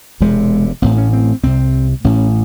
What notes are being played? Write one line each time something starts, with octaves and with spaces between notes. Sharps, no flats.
E1 E2 C3 G#3
A1 A2 C4
C#4
C4
C2 C3 C4
A1 A2 C#4